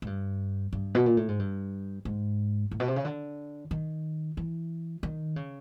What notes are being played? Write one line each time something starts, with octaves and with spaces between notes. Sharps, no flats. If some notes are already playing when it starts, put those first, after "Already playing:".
G#2
G2
G2
B2
A#2
A2
G#2
G2
G#2
A2
B2
C3
C#3
D3
D#3
E3
D#3
C#3